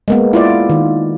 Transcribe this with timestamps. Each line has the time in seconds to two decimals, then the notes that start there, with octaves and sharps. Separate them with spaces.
0.08 G#3 A#3 B3
0.33 E4 F4 D5
0.70 D#3